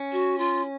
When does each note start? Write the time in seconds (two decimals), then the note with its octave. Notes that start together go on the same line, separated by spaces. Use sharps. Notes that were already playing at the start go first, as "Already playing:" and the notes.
Already playing: C#4
0.12 F#4
0.39 F4